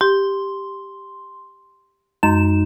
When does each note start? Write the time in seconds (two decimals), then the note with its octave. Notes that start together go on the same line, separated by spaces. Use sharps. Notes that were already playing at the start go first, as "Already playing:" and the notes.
0.01 G4 C6
2.23 F#2 G#3 D#4 E7